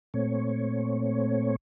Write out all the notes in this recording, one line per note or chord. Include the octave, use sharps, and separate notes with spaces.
A#2 A3 C4 C#5